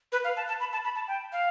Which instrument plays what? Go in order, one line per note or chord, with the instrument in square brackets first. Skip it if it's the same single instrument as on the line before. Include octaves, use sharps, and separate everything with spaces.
[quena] B4
F5
A5
A5
B5
A5
B5
A5
G5
F5